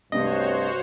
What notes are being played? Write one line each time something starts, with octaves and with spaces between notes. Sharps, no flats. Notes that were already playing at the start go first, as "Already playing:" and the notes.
C2 G2 C3 A3 F#4 C5 C#5 D#5